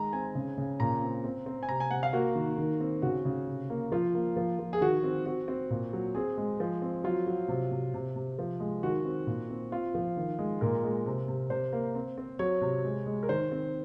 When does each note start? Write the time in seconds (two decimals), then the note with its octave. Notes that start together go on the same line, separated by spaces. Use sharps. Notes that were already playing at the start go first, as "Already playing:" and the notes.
Already playing: D#3 G#3 A#5
0.13 C4 G#5
0.35 C#3
0.58 C#3
0.80 A#2 A#5
1.02 C4
1.24 C4
1.46 C4
1.63 G#5
1.69 C3 A#5
1.80 G#5
1.91 C3 F#5
2.03 F5
2.13 A#3 F#4
2.36 D#3
2.58 D#3
2.80 C4
3.02 C#3 F#4
3.25 C#3
3.47 C3
3.70 A#3
3.92 F3 F4
4.14 A#3
4.36 F3
4.59 F3
4.73 G#4
4.81 D#3 F#4
5.04 C4
5.26 C4 F#4
5.48 C4
5.70 A#2
5.93 F#3
6.15 C4 G#4
6.38 G#3
6.60 F3
6.82 C4
7.04 F#3 F4
7.27 F#3
7.48 C3
7.71 C3
7.94 C3
8.16 C3
8.39 F3
8.60 G#3
8.83 D#3 F#4
9.05 C4
9.27 A#2
9.49 C4
9.72 C4 F4
9.95 F3
10.17 D#3
10.39 G#3
10.61 A#2 A#4
10.84 G#3
11.06 C3
11.28 C3
11.50 C3 C5
11.73 A#3
11.95 C4
12.18 C4
12.39 F#3 C#5
12.61 C3
12.85 G#3
13.06 G#3
13.23 A#4
13.29 D#3 C5
13.52 C4